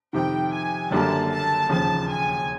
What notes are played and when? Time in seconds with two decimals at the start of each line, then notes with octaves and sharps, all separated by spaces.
0.13 F2 C3 D#3 G5
0.52 G#5
0.91 F#1 F#2 D3 G3 A#3 A5
1.30 A5
1.69 E1 D#2 C#3 F3 A5
2.09 G#5